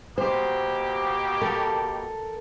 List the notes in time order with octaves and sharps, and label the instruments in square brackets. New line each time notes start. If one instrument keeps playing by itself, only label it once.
[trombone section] B2 A#3 G4 [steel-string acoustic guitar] C5
[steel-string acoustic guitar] A4 A#4